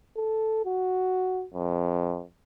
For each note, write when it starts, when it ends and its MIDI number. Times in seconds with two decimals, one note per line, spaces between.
0.16 0.64 69
0.65 1.45 66
1.54 2.23 41